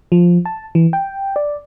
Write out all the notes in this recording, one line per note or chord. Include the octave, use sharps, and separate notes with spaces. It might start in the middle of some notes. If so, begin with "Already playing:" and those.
F3
A5
E3
G5
D5